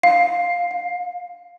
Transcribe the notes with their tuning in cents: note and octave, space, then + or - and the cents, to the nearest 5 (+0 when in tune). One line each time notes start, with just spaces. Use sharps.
F5 +10
F5 +45